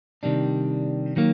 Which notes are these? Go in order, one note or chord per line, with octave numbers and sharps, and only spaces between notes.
C3 D#3 G3 D4
D#3 F#3 A#3